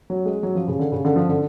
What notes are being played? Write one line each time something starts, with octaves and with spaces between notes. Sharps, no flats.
F#3
G#3
F#3
F3
C#3
D3
C#3
D3
F3
D3